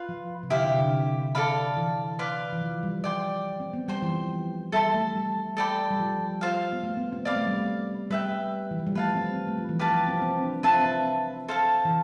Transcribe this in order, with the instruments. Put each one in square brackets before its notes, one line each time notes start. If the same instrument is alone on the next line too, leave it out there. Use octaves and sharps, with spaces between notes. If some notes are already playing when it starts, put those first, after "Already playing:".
Already playing: [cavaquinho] F4 B4 F5
[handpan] F3
C3
[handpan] D3 [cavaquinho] E4 G4 C5 F5
[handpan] C3
D3
[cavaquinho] A4 D5 F5 B5
[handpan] E3
[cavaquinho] B4 D5 F5 C6
[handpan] E3
F3
G3
[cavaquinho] D5 G5 C6
[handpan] C4
B3
[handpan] G3 [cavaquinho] C5 G5 C6
[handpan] E3
F3
[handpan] G3 [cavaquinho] A4 E5 A5 C6
[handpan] A3
G3
[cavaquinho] A4 D5 G5 B5
[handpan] G3
F3
[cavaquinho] F4 C5 F5
[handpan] B3
A3
B3
C4
[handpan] B3 [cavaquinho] D5 F5 B5 D6
[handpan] A3
G3
A3
[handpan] G3 [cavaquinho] B4 E5 G5
[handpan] E3
F3
G3
[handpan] A3 [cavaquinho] B4 F5 A5
[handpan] C4
A3
F3
E3
[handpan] F3 [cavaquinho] G4 B4 F5 A5
[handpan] F3
C4
C4
D4
[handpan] C4 [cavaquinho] F4 B4 E5 A5
[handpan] C4
[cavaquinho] A4 C5 F5 A5
[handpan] E3